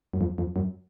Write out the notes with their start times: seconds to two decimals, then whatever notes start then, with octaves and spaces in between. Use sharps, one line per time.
0.13 F#2
0.21 F2
0.38 F2
0.56 F#2